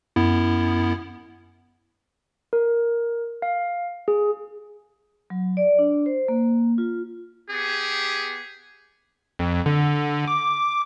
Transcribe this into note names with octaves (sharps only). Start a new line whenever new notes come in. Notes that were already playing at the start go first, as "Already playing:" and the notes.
F#2 B3 E4
A#4
F5
G#4
F#3
D5
D4
C5
A#3
F4
B3 G4 G#4
F2
D3
D6